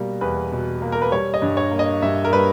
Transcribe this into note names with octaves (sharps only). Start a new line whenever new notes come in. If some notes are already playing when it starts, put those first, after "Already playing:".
Already playing: B2 G3 A#3
E2 B4
B2
A#3
A#4
B4
G3 C#5
D#5
G2
C#5
A#3
D#5
G2 E5
A#4
G3 B4